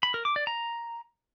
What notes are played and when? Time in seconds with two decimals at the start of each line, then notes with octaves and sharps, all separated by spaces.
0.03 B5
0.14 A#4
0.25 D6
0.36 D5
0.47 A#5